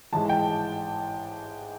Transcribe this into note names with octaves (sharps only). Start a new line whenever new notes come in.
A1 G#2 E3 G#3 A5
G5